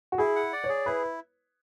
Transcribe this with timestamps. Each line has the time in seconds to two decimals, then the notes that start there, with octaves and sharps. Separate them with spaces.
0.12 F#4
0.18 E4 G#4
0.36 F#5
0.53 D5
0.64 C#5
0.69 G#4
0.86 E4 B4